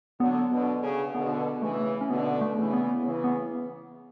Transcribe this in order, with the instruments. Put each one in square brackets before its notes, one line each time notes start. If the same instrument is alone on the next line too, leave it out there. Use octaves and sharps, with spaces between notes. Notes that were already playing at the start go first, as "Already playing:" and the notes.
[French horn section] D3 F#3 [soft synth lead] B3
[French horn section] B2 D3
C#3
[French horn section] B2 D3 [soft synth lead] B3
[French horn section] C#3 E3 [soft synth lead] A3
[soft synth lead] C#4
[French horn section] B2 D3 [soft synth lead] B3
[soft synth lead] A3
[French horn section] C#3 E3
[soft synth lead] B3
[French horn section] C#3 E3
[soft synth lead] B3